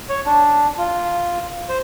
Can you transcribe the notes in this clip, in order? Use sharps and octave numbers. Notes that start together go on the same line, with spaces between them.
C#5
D4
F4
C5